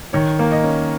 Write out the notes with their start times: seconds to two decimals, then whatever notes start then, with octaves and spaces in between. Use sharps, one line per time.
0.13 D#3 C#5
0.39 A#3
0.52 D#5
0.64 C#4